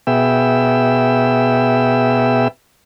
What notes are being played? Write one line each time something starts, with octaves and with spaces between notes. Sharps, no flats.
B2 B3 G#4 E5 G5 E6